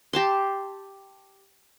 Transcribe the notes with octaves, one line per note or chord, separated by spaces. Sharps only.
G4 A5 C6